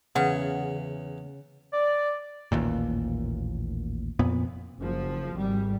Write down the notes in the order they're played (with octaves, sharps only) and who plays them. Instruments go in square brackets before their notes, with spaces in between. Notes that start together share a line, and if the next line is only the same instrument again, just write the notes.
[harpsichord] E2 C#6 [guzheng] C#3 [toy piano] F#5
[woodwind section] D5
[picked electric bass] A1 D#2 A#2
F2 A#2 B3
[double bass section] F#1 F3
G#1 G3